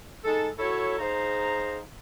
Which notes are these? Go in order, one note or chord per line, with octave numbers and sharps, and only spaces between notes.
G#3 D#4 A4
E4 F#4 A4 C#5
D#4 G#4 C5 F5 A#5